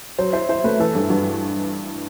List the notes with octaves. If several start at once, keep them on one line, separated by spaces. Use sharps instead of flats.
F#3 C5
E4 C5
E4 C5
A3 B4
E3 A4
G2 A4
G2 F#4